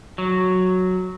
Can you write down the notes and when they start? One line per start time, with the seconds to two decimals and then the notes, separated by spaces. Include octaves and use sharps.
0.18 F#3